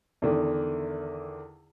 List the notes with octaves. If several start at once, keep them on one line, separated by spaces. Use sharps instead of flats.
E2 D3 D#3